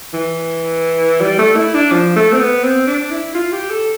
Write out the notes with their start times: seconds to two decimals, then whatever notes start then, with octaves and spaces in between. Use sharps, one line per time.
0.13 E3
1.21 G3
1.38 A3
1.56 E4
1.74 D4
1.92 F3
2.16 A3
2.32 C4
2.40 B3
2.63 C4
2.87 D4
3.11 E4
3.34 F4
3.52 G4
3.70 A4